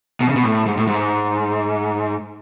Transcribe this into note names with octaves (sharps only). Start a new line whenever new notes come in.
B2
C#3
B2
A2
G#2
A2
G#2